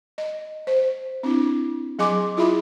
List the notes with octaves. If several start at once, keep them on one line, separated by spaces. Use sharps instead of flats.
D#5
C5
C4 D4 E4
F#3 G#4 D#5 G#5 C6 D6
E4 F4 G#4 E5 B5